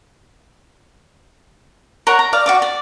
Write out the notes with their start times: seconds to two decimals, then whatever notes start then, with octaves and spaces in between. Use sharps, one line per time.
2.07 A#4 C#5 F#5 A#5
2.19 A#5
2.33 D5 F5
2.46 F#4 D5 D6
2.62 D5